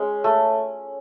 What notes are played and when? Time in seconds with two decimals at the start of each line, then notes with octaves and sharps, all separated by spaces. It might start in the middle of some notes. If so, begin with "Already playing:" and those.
Already playing: G#3 C#4
0.24 A3